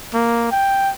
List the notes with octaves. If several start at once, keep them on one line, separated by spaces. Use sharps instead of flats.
A#3
G5